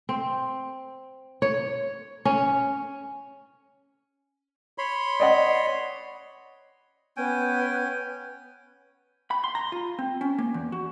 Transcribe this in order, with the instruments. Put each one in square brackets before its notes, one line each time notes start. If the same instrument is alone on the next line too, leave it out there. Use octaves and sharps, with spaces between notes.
[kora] C4
C#5
C#4
[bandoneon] C#5 B5 C6
[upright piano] D5 D#5 F#5
[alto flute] B3 [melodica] C#4 G5 G#5
[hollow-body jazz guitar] B5
C6
A#5
F4
C4
C#4
A#3
E2
F#4